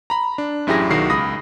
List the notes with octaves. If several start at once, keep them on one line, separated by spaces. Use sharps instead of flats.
A#5 B5
D4
A1 F#2 E4 G4 G#4 A#6
B1 D#3 F#4 C7
C#2 B5 D#6 A#6